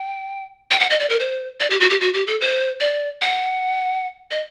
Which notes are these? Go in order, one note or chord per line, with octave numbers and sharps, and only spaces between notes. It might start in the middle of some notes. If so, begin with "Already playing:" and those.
Already playing: G5
G5
F#5
D#5
D5
A#4
C5
D5
G4
F#4
G4
F#4
G4
A4
C5
D5
F#5
D#5